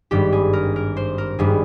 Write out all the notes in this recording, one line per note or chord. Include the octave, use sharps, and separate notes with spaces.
G#1 G2 G3 G4
G#4
A#4
A#4
C5
A#4
G#1 G2 G3 G#4